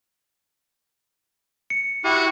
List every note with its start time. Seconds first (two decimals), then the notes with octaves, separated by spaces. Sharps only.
1.70 C#7
2.04 E4 F#4 G4